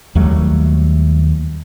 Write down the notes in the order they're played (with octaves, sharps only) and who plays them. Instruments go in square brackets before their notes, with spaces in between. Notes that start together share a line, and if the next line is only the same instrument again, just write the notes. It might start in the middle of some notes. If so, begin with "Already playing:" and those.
[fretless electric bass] D#2 F#3 G3 A3